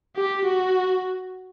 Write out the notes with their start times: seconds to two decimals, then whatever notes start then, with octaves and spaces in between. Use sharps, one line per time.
0.15 G4
0.45 F#4